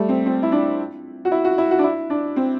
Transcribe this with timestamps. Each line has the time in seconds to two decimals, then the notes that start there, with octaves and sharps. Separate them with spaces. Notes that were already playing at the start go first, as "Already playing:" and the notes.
Already playing: G3 A3
0.09 C4
0.26 C4
0.43 E4
0.52 D4
1.25 F#4
1.32 E4
1.45 F#4
1.58 E4
1.71 F#4
1.79 D4
1.84 E4
2.10 D4
2.36 C4